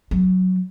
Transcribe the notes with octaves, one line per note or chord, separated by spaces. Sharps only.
F#3